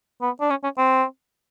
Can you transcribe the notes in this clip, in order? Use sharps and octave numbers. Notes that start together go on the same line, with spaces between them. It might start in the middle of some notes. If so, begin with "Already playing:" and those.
B3
D4
C#4
C#4
C4